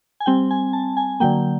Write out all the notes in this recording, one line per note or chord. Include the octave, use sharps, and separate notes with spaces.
G#5
G3 C4 G5
G#5
A5
G#5
D3 F#3 A#3 G5